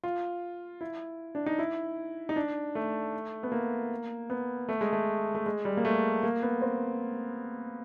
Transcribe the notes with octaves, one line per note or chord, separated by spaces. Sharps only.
F4
E4
D4
D#4
E4
D#4
D4
A3
B3
A#3
B3
A3
G#3
A3
A3
G#3
G3
A#3
A3
A#3
B3
C4